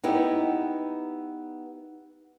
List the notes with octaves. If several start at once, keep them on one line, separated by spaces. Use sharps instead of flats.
B3 D#4 E4 G4